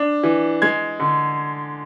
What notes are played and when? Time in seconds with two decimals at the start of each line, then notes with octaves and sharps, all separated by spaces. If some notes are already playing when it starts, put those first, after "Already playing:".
Already playing: D4
0.23 E3
0.62 G#3 G#6
1.00 D3